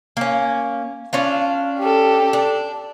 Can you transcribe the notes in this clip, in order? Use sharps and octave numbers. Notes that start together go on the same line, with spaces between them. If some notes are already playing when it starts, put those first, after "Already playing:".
A#3 C#4
C#4 D4 F4
G4 A4
D4